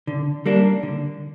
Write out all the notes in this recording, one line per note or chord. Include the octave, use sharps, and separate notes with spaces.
D3
G3 A#3 D4
D3